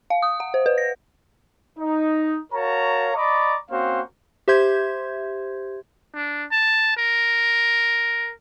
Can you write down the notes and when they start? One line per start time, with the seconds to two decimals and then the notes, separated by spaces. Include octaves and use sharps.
0.10 F5
0.22 D#6
0.40 F#5
0.54 C5
0.66 B4
0.78 A#6
1.78 D#4
2.53 F#4 A#4 C#5 F5 A5 A#5
3.16 D5 D#5 A#5 B5 C#6 D6
3.71 A#3 C4 C#4 F#4 C5 F5
4.48 G4 C5 E5 C6 G6 G#6
6.14 D4
6.52 A5
6.97 A#4